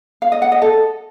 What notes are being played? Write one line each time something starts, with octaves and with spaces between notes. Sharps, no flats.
F5
D#5
F#5
D#5
A4